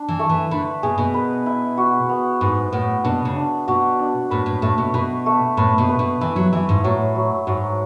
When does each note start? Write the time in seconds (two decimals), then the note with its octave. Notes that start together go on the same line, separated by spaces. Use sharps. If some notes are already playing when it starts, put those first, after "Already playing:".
Already playing: D4
0.09 E3
0.19 A3
0.29 E3
0.51 D3 B4
0.83 B2 G#4
0.98 B2
1.14 B4
1.46 E4
1.77 F#4
2.09 B3
2.41 G#2 B3
2.72 A2 B3
3.04 B2 D4
3.25 C#3
3.36 D4
3.68 B2 F#4
3.99 D4
4.30 A2 B4
4.46 A2
4.62 A2 A3
4.78 B2
4.94 B2 B4
5.26 A3
5.57 A2 B4
5.78 B2
5.89 B4
5.99 B2
6.21 E3 E4
6.36 F#3
6.52 E3 E4
6.69 G#2
6.84 A2 F#3
7.15 F#3
7.47 G#2 F#3